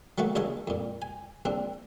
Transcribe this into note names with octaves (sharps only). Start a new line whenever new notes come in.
F#3 A3 A#3 F#4
A#1 C#3 C#5 D#5 A5 D#6
F2 A#2
G#5
A#1 C4 D4